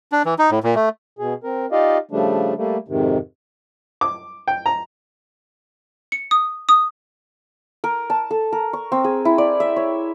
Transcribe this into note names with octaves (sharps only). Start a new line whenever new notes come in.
D4
E3
D#4
A2
A#2
A3
B2 G#4
C4 A#4
D#4 F4 G4 D5 D#5 F5
C#3 F3 G3 A3 D4
G3 A3 A#3
F2 G#2 C3 D#3
D6
G5
A#5
C#7
D#6
D#6
A#4
A5
A4
A#4
C#6
C4
G#4
E4
D5
E5
C#5